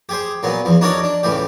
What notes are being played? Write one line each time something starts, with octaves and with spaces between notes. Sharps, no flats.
G4 G#4 C5
A#2 F#3 B3
E2 F3
D4 D#4 F#4 A#4 C#5 D5
D4
C#2 A2 E3 G4